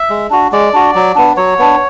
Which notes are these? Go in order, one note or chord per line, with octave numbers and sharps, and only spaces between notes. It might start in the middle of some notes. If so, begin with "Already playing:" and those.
Already playing: E5
G#3
D4 F#4
G#3 D5
D4 F#4
F#3
B3 D4
F#3 C#5
B3 D4